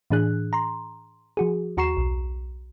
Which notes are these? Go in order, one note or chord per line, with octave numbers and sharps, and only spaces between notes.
A2 E3 D4 G#4 F#6
A#5 C6
F3 F#4 G#4
D#2 F#4 A#5 C#6 C7 E7
B1